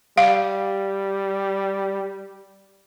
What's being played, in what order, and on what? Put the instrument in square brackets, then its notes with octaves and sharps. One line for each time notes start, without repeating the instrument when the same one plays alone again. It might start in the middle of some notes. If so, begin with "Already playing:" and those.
[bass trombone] G3 [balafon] F5